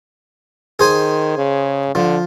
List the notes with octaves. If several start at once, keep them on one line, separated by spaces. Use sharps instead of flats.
D#3 G#4 C5 G#5
C#3
D3 F3